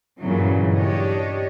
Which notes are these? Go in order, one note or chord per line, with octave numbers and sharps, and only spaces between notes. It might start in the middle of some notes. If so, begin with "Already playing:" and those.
G2 A#2 C#3 E3 F#3
D4 G4 C#5 D#5